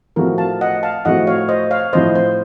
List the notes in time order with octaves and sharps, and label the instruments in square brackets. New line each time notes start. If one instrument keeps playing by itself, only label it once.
[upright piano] A2 F3 A3 C4 F#4 [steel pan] A#4
[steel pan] F5 A5
D#5 F#5
F5 A5
[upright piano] A2 F3 A3 C4 F#4 [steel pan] D#5 F#5
[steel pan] C#5 F5
C5 D#5
C#5 F5
[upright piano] A2 F3 C4 [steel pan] C5 D#5
[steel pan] C5